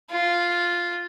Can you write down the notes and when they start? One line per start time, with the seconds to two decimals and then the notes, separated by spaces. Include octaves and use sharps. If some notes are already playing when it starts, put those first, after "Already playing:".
0.11 F4